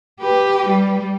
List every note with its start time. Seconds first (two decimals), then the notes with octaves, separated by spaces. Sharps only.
0.20 G4 B4
0.67 G3